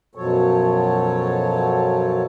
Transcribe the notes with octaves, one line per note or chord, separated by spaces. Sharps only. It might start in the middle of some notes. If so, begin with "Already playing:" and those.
F#2 B2 F3 F#3 A4 C#5